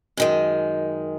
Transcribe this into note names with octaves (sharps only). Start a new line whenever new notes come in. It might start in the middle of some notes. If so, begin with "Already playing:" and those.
F#2 D#3 G#3